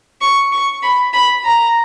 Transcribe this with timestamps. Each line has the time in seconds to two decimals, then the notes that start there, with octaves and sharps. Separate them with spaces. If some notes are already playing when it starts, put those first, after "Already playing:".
0.21 C#6
0.52 C#6
0.83 B5
1.13 B5
1.44 A#5